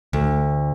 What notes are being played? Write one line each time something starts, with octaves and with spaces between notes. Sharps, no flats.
D2